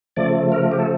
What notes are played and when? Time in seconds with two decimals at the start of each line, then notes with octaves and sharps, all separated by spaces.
0.17 C#3 F3 A3 D5
0.52 A#4
0.72 G4
0.80 A4